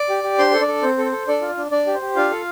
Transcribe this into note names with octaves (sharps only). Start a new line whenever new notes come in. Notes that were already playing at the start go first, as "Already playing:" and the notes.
Already playing: D5 D6
G4
G4
D4 C5 C6
A4 C5
D4 D5
A4
C4 C5
A4
C5
A4
D4 A4 D5
F4
D4
D4 D5
G4
C5
G4
D4 F4 F5
A4